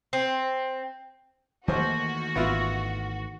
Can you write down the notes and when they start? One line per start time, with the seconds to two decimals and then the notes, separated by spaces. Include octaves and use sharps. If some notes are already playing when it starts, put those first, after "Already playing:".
0.13 C4
1.68 D#2 D#3 E3 A3 F#4 C5
2.36 G#1 B3 E4 F4